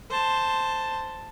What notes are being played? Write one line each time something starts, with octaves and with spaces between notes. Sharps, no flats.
C5 A5